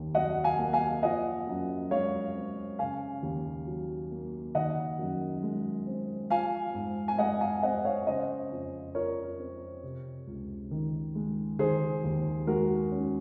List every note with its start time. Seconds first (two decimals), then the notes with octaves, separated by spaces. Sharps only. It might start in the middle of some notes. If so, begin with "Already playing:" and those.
Already playing: D#2 D#3
0.15 F#3 D#5 F#5
0.44 F5 G#5
0.59 A#3
0.73 F5 G#5
1.03 F3 D#5 F#5
1.47 F#2
1.91 G#3 C#5 F5
2.35 C4
2.79 C#3 F5 G#5
3.23 D#2
3.67 F#3
4.11 A#3
4.55 D#3 D#5 F#5
4.99 F#2
5.43 G#3
5.87 C4
6.30 F3 F5 G#5
6.74 G#2
7.08 G#5
7.18 G#3 D#5 F#5
7.41 F5 G#5
7.63 C4 D#5 F#5
7.85 C#5 F5
8.07 C#3 C5 D#5
8.51 F2
8.95 F3 A#4 C#5
9.39 C4
9.83 C3
10.27 C#2
10.71 D#3
11.15 G#3
11.59 D#3 G#4 C5
12.04 D#2
12.47 G#3 F#4 A#4
12.92 C#4